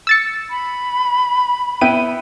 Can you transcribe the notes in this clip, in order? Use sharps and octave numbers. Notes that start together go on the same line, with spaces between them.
E6 A6 C#7
B5
B3 E4 G5 D#7